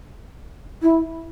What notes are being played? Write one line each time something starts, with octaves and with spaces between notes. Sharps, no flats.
E4